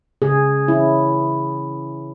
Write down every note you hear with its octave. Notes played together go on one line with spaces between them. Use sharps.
C#3 G#4
E3 C#4 E4